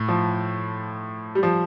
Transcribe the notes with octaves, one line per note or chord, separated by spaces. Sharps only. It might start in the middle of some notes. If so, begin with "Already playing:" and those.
Already playing: A2
F3
G3
F3